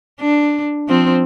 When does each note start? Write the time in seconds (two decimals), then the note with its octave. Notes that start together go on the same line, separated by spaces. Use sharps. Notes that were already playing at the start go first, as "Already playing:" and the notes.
0.20 D4
0.88 F3 C4